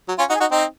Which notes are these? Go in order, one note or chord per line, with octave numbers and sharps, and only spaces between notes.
F#3
C#4 F4
D#4 F#4
G#4
D#4 F#4
C4 D#4